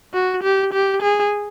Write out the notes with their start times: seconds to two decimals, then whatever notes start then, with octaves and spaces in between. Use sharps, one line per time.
0.14 F#4
0.43 G4
0.73 G4
1.03 G#4